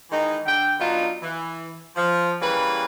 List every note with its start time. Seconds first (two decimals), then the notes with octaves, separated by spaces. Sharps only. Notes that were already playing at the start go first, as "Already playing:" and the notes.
0.10 D#3 E3 G#3 D#4
0.46 D3 G5
0.80 F#3 B3 D4 D#4 F4
1.22 E3
1.96 F3
2.42 C#3 E3 G3 A#3 B4